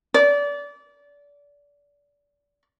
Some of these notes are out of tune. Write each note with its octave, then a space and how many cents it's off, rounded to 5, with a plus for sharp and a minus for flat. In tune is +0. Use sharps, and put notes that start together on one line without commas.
D5 -25